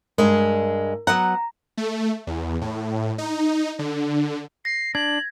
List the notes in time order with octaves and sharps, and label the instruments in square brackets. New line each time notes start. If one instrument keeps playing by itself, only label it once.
[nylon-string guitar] G2 G#3 [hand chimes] A#4
[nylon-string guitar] F#3 B3 F#5 [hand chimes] A#5
[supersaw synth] A3
E2
A2
D#4
D3
[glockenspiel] A#6 [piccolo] C7
[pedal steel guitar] D4 [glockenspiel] G#6 [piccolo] F#7